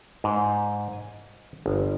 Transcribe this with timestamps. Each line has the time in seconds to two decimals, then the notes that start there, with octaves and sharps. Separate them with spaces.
0.24 G#2
0.93 G#5
1.66 G1